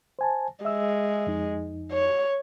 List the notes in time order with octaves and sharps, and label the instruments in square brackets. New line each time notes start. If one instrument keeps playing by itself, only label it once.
[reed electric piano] C5 G#5 A5
[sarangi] G#3 [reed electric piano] E5 E6
[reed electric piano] F2 D#4
[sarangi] C#5